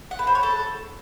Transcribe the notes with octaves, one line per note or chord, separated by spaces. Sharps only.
F#5
B4
C5
C#5
A4